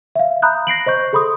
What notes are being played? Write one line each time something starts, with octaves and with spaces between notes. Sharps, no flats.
E5 F5
A#5 B5 D#6 F#6 G6
A#6 C7 D7 F#7
C5 D#5 C#6 G6
G#4 A4 B5 C6 D#6